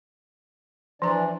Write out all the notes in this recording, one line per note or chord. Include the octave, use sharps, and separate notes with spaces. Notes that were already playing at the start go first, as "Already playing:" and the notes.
E3 F3 D4 D5 A#5